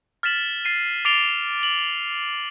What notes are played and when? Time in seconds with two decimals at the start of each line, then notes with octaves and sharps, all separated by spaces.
0.23 F6 A6 B6 E7 F#7
0.65 A6 C7 D#7
1.05 D6 A6 C7 D7 F7 G7
1.63 F#7